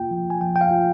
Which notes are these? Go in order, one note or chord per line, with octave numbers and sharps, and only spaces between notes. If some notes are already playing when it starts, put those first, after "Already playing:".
Already playing: A#3 F4 G5
F3
G#5
F3 G5
G5
F5
F4